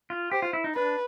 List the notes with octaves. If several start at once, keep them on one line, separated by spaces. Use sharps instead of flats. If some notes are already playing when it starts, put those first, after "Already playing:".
F4
G4 C5
F4
E4
D#4
D4 B4